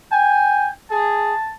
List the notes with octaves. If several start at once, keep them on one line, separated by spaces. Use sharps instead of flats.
G5 G#5
G#4 A5